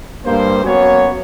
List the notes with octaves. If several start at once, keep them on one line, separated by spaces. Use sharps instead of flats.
G2 A#3 C5
F#3 A#3 B3 C#4 F#4 C#5